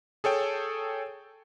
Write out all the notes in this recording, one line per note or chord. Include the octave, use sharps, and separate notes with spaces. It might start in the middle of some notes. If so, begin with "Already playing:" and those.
G#4 A4 C#5 G5